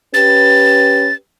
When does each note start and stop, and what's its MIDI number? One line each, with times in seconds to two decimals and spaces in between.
0.14 1.11 61
0.14 1.11 67
0.14 1.11 71
0.14 1.14 93